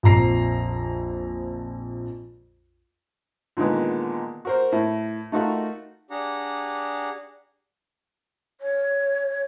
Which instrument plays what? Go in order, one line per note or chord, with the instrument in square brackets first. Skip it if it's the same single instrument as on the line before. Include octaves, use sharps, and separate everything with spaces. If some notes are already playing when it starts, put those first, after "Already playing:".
[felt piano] A#1 F2 A#5 C7
[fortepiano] A#2 D3 D#3 G#3 B3
F#4 A#4 C5
A2
A3 D#4 F4 F#4 A#4
[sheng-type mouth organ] D4 G4 G#4 F#5 A#5
[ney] C#5